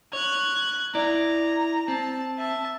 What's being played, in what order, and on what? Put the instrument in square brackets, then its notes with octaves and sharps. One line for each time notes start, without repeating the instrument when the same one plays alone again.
[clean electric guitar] C#5 [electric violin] F#6 G#6
[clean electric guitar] E4 D5 [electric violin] A#5
[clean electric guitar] C4 [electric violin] A5
[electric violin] E5 A5